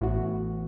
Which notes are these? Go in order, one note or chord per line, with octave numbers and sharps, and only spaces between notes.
A1 A2 E3 B3 F#4